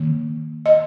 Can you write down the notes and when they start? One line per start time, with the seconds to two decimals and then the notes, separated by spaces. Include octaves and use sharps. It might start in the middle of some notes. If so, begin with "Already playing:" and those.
Already playing: D#3 A#3
0.66 D#5